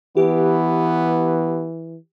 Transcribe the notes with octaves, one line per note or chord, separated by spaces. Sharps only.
E3 B3 G4